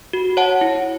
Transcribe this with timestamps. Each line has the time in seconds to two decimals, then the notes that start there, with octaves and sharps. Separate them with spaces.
0.13 F#4
0.37 C#5 F#5 A5
0.61 E4